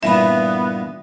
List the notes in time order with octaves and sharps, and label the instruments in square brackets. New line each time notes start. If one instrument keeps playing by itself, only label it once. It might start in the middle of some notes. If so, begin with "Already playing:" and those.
[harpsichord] G2 A#2 E3 [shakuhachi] B3 [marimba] E5 B5